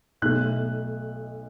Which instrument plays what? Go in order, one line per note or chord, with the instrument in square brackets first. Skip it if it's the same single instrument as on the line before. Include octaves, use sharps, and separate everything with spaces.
[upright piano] B1 B2 A3 F#6